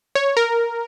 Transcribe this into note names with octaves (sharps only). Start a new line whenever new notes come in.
C#5
A#4